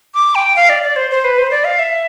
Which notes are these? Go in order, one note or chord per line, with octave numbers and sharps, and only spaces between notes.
D6
G5
F5
D5
D5
C5
C5
B4
C5
D5
F5
E5